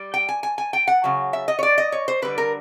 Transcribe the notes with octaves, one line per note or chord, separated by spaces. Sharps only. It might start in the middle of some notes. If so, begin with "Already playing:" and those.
Already playing: G3
G5
G#5
G#5
G#5
G5
F#5
C#3 F#3
E5
D#5
C#5
D5
D#5
C#5
C5
D3 G3 B4
A#4